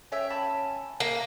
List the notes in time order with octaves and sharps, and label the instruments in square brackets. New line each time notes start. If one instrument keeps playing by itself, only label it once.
[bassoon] C#4 [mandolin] C#5 E5 G5
[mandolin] A5 B5
[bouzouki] A#3